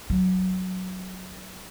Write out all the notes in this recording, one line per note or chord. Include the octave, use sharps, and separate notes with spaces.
F#3